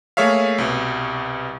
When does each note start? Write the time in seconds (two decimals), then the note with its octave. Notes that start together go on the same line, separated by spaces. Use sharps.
0.17 A3 A#3 G#4 C#5 E5 F5
0.58 C2 B2